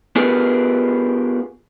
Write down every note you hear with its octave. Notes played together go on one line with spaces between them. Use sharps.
B3 F4 G4 G#4 A#4 B4